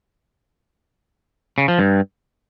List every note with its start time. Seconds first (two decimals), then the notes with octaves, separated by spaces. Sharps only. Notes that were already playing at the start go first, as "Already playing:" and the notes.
1.58 C#3
1.68 F3
1.79 G2